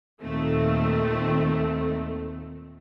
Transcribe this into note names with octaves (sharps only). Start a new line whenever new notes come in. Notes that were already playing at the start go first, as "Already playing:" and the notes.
D#2 A#2 D#3 A3 C4